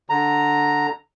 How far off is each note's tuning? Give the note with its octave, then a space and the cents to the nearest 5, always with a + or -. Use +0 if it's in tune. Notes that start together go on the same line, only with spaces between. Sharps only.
D3 +0 A#5 +0